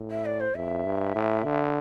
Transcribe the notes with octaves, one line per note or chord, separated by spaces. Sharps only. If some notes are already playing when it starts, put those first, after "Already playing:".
Already playing: A2
E5
D5
C5
F2 E5
G2
A2
D3